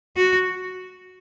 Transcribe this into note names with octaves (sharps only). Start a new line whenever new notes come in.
F#4